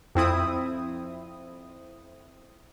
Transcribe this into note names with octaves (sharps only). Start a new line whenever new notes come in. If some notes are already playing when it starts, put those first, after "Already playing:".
F2 C4 E4 D#6